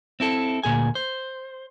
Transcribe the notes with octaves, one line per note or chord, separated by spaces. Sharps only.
C4 E4 A4
D2 A#2 G#4 G#5
C5